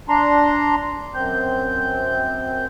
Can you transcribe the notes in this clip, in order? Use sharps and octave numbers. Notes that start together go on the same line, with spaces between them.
D4 A#5 C6
F#2 C4 G6